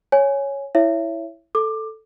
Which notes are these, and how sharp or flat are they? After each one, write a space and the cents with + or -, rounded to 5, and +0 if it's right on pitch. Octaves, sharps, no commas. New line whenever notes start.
C#5 +0 G#5 +0
E4 +0 C#5 +0 E5 +25
A4 +0 D6 +15